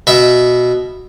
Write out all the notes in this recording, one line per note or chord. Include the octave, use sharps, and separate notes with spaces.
B2 E5